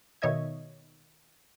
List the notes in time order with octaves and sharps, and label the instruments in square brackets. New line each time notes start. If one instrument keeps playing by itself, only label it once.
[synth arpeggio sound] B2 D#3 C#5 D#5 E5 G#6